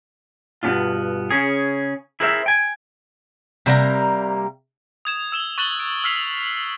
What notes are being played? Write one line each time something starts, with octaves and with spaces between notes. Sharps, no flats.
G2 B2 B3 C#4 D4 F4
C#3 C#4 G#4
E4 G#4 A#4 C5 D#5 E5
G5 G#5
C3 G3 A#3 A#5
D#6 G#6 E7
E6 E7 G7
C#6 F#6 A6 E7 F#7 G7
D7
E6 F6 B6 C7 F7 G7